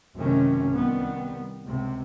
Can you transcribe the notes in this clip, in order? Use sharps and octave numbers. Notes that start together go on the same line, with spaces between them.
F#1 C3 D#3 A3 C#4
C2 D#3 G3 B3
C#2 C3